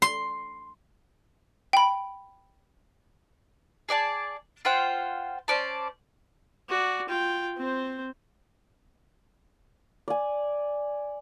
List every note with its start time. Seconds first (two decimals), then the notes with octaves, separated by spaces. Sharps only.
0.02 C6
1.73 G5 B5
3.89 G#4 D5 G5 A5
4.65 F4 C5 F#5 G5
5.48 C#4 C5 D5 A5
6.69 F#4 D5
7.09 F4 G5
7.57 C4 C5
10.08 D5 G#5